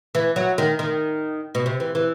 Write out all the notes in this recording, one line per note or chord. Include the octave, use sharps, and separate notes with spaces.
E3
F#3
D#3
D#3
B2
C3
E3
E3